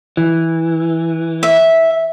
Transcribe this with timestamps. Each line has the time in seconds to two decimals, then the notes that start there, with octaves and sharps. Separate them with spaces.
0.17 E3
1.43 E5